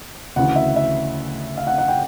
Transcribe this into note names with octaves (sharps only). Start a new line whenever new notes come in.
D2 C#3 E3 F#5
E5
E5
F5
F#5
F#5
G5